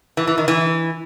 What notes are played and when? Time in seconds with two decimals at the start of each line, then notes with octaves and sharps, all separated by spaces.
0.17 E3
0.27 E3
0.38 D#3
0.48 E3